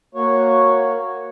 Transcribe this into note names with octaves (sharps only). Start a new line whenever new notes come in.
A#3 F#4 C#5